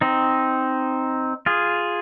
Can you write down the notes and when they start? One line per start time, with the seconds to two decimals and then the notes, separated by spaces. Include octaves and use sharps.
0.01 C4 D#4
1.46 F4 G#4